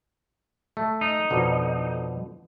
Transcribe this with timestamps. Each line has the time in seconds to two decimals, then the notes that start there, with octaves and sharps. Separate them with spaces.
0.77 A3
1.01 D#4
1.30 F2 B2 D3